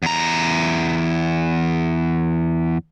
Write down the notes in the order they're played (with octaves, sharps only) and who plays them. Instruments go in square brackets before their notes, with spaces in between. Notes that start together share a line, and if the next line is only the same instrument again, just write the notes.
[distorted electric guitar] E2 A#5